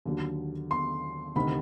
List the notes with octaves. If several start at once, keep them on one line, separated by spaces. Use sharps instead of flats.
D#2 D3 F#3
C6
D2 C3 D#3 B5